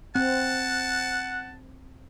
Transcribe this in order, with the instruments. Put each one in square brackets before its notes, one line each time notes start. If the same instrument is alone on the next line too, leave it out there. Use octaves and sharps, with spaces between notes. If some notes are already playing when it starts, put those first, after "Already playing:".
[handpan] C4 [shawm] F#5 [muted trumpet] A5